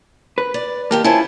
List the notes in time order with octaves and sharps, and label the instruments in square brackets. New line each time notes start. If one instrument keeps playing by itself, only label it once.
[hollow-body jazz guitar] B4
[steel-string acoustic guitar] D5
[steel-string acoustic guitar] D#3 G4 A5 [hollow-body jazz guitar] A#3
[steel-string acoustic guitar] C#4 C5 A5 [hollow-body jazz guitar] E4 F4